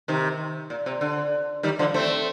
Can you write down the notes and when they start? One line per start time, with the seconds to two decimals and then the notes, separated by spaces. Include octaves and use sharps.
0.08 C3 D#3
0.70 A#2
0.86 C3
1.01 D3
1.63 D#3 G3
1.79 D3 F3
1.94 A3 C4